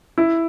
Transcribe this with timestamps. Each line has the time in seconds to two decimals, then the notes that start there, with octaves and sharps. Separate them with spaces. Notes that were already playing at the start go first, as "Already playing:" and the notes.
0.18 E4